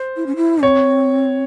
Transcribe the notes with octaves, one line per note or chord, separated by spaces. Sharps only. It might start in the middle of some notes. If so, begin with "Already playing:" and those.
Already playing: C5
E4
C#4
E4
C4 C#5